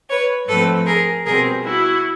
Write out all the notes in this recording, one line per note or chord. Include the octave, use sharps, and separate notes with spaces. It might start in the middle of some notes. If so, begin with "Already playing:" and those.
B4 C#5
G#2 F3 A3 C4 A4 B4
G#4 A#4
B2 G3 C4 G#4 A#4
E4 F#4